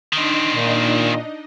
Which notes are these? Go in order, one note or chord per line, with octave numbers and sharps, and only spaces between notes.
D#3 C4 D4 D#4 D#5
A#2